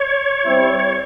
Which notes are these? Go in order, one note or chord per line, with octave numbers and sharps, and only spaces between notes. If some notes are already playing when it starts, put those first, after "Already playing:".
Already playing: C#5
G3 C4 E4
C#5